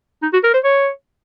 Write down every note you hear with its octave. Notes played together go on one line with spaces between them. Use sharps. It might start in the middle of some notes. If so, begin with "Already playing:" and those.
D#4
F#4
A#4
C5
C#5